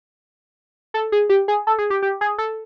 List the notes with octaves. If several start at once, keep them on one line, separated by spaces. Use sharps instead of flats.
A4
G#4
G4
G#4
A4
G#4
G4
G4
G#4
A4